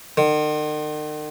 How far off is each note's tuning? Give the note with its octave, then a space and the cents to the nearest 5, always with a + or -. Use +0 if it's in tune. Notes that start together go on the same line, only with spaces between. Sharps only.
D#3 -45